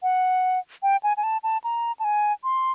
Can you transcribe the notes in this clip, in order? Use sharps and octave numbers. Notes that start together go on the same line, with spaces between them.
F#5
G5
G#5
G#5
A5
A5
A#5
A5
G#5
C6